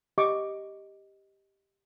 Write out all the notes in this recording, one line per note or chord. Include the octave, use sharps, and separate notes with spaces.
G4 D#5 C#6 D6